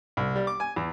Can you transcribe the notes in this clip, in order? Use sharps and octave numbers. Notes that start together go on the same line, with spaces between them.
C2
G3
D6
G#5
E2